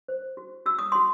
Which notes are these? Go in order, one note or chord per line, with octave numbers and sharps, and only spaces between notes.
C5
F#4
F#4 E6
D#6
F#4 C6